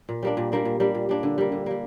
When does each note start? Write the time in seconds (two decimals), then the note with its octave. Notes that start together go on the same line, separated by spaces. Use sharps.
0.09 A#2
0.23 G3 A#3 D4
0.37 A#2
0.52 G3 A#3 D4
0.65 A#2
0.80 G3 A#3 D4
0.95 A#2
1.09 G3 A#3 D4
1.23 D3
1.38 G3 A#3
1.52 D3
1.66 G3 A#3